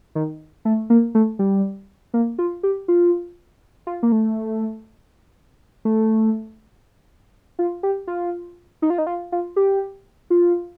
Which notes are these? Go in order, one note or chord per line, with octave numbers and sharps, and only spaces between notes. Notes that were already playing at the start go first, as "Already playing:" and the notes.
D#3
A3
A#3
A3
G3
A#3
F4
G4
F4
F4
A#3
A3
A3
F4
G4
F4
D#4
F4
D#4
F4
F4
G4
F4